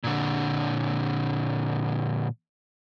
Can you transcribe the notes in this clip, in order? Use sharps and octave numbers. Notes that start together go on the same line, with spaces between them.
A#2 D3